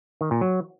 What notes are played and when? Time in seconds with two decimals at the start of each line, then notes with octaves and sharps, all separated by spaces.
0.21 D#3
0.31 A#2
0.41 F#3